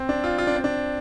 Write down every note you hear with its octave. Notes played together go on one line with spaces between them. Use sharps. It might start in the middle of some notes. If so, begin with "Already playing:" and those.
Already playing: C4
D4
F4
F4
D4
C4
D4